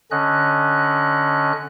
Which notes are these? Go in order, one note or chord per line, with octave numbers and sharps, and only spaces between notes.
D3 C#4 D#5 F#6